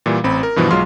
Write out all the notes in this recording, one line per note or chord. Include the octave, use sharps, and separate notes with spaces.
A#2 E3 G3
A1 C4 B5
A#4
G2 B2 E3 F3
B1 F#3 G#3 F4 C6 F6